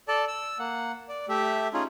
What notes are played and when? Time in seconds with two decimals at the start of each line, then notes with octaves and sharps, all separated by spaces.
0.08 A4 D5 A5
0.28 E6
0.59 A#3 F#5
1.09 D5
1.29 A3 G4 E5
1.74 C#4 D#4 F4 G#4